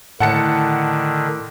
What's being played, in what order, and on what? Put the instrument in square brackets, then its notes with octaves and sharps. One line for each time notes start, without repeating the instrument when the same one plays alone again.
[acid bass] A2 [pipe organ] D3 D#3 [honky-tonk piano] F#5 A5 C#7